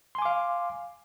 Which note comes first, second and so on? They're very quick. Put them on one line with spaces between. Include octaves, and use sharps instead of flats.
C6 G#5 D6 F5